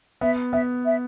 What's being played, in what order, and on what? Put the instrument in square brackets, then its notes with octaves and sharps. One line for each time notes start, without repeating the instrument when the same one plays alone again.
[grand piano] B3 [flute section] E5
[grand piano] B3 [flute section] E5
[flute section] E5